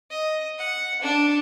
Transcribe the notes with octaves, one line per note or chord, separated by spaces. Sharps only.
D#5
F#5
D4